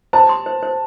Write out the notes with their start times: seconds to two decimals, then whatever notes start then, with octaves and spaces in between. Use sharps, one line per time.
0.13 C5 A5
0.29 C6
0.46 C5
0.63 C5